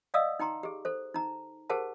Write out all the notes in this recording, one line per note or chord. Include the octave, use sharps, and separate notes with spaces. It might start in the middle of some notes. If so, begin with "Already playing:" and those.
D5 D#5 F5 F#5 D#6 E6
D#4 G5 A#5 C6
G4 G#4
A4 C5
D#4 A#5
G4 G#4 A#4 C5 F#5 A5